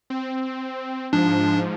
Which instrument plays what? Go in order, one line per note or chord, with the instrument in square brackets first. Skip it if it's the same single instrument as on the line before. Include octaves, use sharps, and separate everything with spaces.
[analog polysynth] C4
[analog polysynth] G#2 F3 [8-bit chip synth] D4